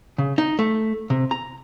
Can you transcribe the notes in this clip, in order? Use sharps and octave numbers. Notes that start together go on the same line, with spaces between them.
C#3
D#4
A3
C3
A#5